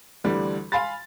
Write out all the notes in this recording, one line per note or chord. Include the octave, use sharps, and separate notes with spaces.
D2 D3 E3 G3 D4
F5 G#5 B5 C6 A6